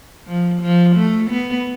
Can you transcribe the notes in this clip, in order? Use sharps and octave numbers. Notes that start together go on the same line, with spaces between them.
F3
F3
A3
B3